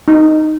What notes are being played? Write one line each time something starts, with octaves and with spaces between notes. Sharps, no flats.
D#4